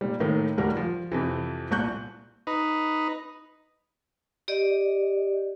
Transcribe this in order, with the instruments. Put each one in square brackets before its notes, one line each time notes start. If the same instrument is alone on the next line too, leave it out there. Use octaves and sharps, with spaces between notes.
[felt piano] A#2 G3
A2 D#3 A3 A#3
D#1 D2 G3 A#4
F3
F2 C3 E3
C2 A#2 C#6 F#6 G6
[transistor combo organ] D#4 B4
[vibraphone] G4 D5 D#5